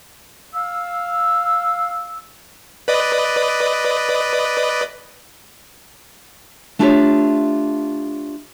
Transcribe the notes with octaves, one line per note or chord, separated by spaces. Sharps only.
F5 E6
B4 D5 D#5
A3 D4 F4 G4 C#5 E5